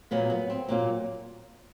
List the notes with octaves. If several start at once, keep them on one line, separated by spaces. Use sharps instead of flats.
A#2 F#3 A#3 B3
B3
C4
A#2 F#3 A#3